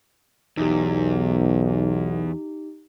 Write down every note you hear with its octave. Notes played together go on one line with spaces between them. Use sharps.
B1 E2 D#4 G4